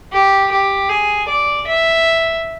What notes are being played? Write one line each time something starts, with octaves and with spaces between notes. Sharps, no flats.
G4
G4
G#4
D5
E5